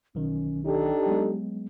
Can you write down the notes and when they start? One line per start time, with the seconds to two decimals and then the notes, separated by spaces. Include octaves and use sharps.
0.15 B1 D#3 C#4
0.66 D4 D#4 G4 A4
1.06 F#3 G#3 B3